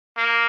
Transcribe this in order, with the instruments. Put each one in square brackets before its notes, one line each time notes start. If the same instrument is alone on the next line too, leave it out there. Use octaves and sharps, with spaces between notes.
[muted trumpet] A#3